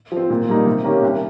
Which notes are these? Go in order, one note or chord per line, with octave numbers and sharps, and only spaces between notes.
F3
C4
A#2
G3 A#3 D#4
C3
D#3 A#3 C#4 G4
C2